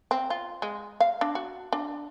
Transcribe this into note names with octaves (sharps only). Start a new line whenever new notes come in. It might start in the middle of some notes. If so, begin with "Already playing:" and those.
C4
F4
G#3
F5
D4
F#4
D4